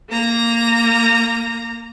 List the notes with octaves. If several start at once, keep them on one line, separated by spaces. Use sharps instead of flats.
A#3 A#5